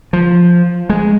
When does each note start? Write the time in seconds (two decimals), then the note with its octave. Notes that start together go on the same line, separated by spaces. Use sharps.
0.13 F3
0.90 G#3